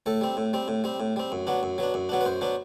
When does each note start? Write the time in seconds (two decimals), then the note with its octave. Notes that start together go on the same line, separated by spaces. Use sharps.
0.06 A2 A4
0.21 G3 C4
0.37 A2
0.53 G3 C4
0.68 A2
0.84 G3 C4
1.00 A2
1.16 G3 C4
1.32 F#2
1.47 F#3 B3 D4
1.63 F#2
1.78 F#3 B3 D4
1.94 F#2
2.09 F#3 B3 D4
2.21 B4
2.25 F#2 C5
2.41 F#3 B3 D4